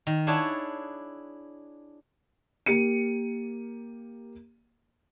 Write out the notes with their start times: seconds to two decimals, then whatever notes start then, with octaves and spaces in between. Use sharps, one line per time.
0.07 D#3
0.27 D4 E4 G#4 C#5 F#5 A5
2.66 A#3 G4 C#7 D#7